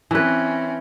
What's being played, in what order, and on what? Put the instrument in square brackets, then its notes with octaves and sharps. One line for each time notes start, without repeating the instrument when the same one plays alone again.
[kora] E3 B4 [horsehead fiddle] C4 C#4